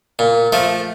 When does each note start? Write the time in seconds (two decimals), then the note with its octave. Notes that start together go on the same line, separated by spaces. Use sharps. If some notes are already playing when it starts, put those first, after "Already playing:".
0.19 A#2
0.52 F3 A3